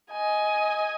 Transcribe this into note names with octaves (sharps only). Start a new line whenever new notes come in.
D#5 G#5